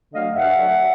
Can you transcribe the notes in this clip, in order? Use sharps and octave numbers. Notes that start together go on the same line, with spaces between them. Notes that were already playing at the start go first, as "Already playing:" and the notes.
D3 F#3 A3 D#5 F5
G2 E5 F#5
D3 F#3 A3